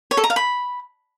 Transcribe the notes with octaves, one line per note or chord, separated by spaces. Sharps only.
C#5
A4
A#5
F5
B5